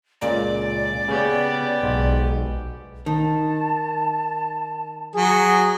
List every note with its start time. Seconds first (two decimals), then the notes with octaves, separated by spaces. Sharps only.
0.21 C#2 A#2 D5 A#5
1.08 C#3 B3 G4
1.83 B1 G#2
3.06 D#3 A5
5.16 F#3 G#4 D#6